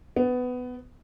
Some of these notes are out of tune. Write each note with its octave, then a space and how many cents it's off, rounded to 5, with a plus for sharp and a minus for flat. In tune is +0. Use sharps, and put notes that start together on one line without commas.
B3 +15